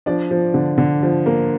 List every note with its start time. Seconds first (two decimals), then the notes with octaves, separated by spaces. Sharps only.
0.06 F3 D4 D5
0.31 F3
0.54 D3
0.78 D3
1.03 F3
1.26 A#3